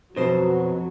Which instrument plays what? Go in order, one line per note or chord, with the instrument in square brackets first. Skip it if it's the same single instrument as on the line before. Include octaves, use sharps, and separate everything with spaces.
[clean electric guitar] F2 [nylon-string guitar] B2 C5 D#5 [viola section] F#3